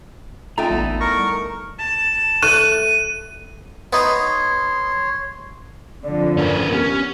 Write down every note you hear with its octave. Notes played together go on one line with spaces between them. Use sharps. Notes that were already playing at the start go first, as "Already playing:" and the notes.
A3 C#4 D#4 F4 G5 A#5
A1 D2 G3 B3 E4
A#4 C#6 A#6
A5
A3 F#6 D#7
B3 D#4 C#5 C6
F2 D3 F3 D5
B3 C#4 A#4
B3 C#4 G4